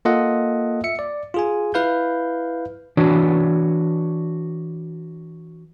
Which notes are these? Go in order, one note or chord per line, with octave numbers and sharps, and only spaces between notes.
A#3 F4 A4 D#5 F#5
E5 C#7
D5
F4 G#4 G#5
E4 B4 F5 G6
E3 D4 F#4 B4 C#5 D5